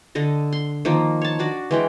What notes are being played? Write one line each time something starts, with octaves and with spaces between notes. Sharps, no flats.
D3 A4 D#5
C6
D#3 F3 A#3
C#5 A5
D4 F#4 D5
E3 G#3 G5